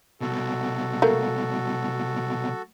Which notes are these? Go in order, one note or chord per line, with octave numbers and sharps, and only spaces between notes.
C2 B2 F#4 A4
A3 A#3